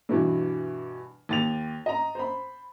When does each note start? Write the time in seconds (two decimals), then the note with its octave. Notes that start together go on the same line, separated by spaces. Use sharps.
0.09 G2 B2 E3
1.29 D#2 A6 F7
1.86 D#5 A#5
2.15 C5 B5